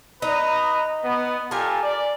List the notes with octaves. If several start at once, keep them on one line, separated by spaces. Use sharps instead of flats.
D#4 B4 D#5 A#5
B3
F4 G4 A4 A#4 G#5
D5